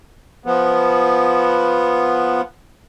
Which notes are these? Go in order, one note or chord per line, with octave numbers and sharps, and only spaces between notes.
F3 B3